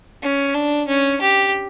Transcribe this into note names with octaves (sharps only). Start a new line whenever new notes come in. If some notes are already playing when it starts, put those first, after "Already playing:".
C#4
D4
C#4
G4